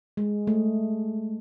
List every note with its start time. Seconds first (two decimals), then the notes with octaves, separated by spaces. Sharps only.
0.17 G#3
0.47 A3